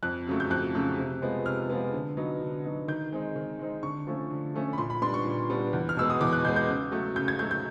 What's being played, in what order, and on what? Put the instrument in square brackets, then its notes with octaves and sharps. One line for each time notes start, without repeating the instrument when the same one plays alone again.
[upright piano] F2 F#6
C#3 F#3 A3
G6
F2 F#6
C#3 F#3 A3
C3
F3 G#3 B3
C3 F6
F3 G#3 B3
D3
F#3 B3 D#4
D3
F#3 B3 D#4
D#3 G6
G#3 C4 D#4
D#3
G#3 C4 D#4
D3 C#6
F3 A3 C#4
D3
F3 A3 C#4
B5
A#2 C6
B5
G3 B3 D4 C6
C#6
A#2
G3 B3 D4
E2
F6
B2 G#3 B3 E6
D#6
E2 D6
F#6
B2 G#3 B3 G6
G6
C#3
F#3 A3
C#3 G6
G#6
F#3 A3 G6
G6